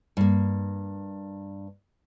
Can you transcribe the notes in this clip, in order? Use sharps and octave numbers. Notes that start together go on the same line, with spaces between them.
G2 A#3